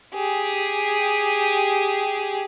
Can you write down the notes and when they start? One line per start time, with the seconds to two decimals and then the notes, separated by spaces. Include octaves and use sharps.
0.14 G4 G#4